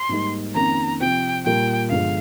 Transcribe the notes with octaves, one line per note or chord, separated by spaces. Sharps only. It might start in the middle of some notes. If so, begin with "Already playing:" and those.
Already playing: C6
G#2 G3 A#3 D#4
F2 D#3 A#3 C#4 A#5
C3 F3 C4 G5
A#2 G3 A#3 F4 A#4 G5
G1 G2 F3 G#3 F5